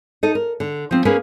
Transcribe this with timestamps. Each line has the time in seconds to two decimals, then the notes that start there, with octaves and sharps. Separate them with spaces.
0.23 D#4 A4 D#5
0.35 A#4
0.60 D3
0.91 F3 C4
1.05 A#3 C#4 G#4 A#4 B4